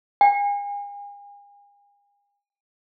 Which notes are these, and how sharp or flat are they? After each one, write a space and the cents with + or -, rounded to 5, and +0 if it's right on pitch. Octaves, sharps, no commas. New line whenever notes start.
G#5 -40